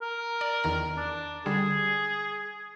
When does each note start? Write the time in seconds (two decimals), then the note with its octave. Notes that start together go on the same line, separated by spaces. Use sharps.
0.02 A#4
0.41 D5
0.64 E2 D#3 A#5
0.97 D4
1.46 D3 G3 G#4